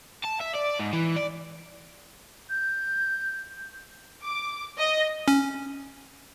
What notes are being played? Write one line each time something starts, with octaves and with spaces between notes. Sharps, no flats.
A5
E5
D5
G#2
E3
D5
G6
D6
D#5
C#4